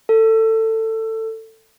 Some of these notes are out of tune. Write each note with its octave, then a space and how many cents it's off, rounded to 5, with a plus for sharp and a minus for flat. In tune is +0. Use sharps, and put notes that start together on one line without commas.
A4 +20